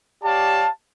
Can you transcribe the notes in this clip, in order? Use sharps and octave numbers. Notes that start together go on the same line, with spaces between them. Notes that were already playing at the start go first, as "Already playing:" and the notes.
G4 C#5 D5 F5 A5